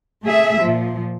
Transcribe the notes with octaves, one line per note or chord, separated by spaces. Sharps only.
A3 G#4 E5
A#2 F3